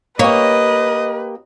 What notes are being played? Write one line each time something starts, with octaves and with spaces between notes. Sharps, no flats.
A#3 G4 B4 C#5 D#5